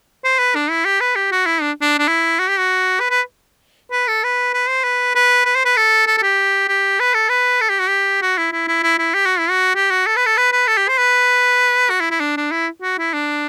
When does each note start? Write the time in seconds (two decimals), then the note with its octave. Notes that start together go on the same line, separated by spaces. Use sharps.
0.24 C5
0.39 B4
0.55 D4
0.70 E4
0.85 G4
1.01 B4
1.15 G4
1.32 F#4
1.46 E4
1.62 D4
1.82 D4
1.99 D4
2.08 E4
2.39 F#4
2.48 G4
2.58 F#4
3.00 B4
3.11 B4
3.92 B4
4.08 A4
4.24 B4
4.54 B4
4.69 C5
4.84 B4
5.15 B4
5.45 B4
5.55 C5
5.65 B4
5.77 A4
6.07 A4
6.18 A4
6.23 G4
6.68 G4
7.00 B4
7.14 A4
7.29 B4
7.61 A4
7.70 G4
7.80 F#4
7.89 G4
8.22 F#4
8.38 E4
8.52 E4
8.68 E4
8.83 E4
8.99 E4
9.14 G4
9.26 F#4
9.39 E4
9.50 F#4
9.76 G4
9.91 F#4
10.07 A4
10.16 B4
10.26 A4
10.37 B4
10.52 B4
10.67 A4
10.77 G4
10.88 C5
10.98 B4
11.90 F#4
12.01 E4
12.11 E4
12.20 D4
12.37 D4
12.51 E4
12.82 F#4
12.98 E4
13.14 D4